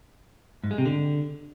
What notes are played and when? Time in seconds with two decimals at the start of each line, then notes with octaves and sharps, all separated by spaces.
0.64 G#2
0.71 G#3
0.78 C3
0.86 D3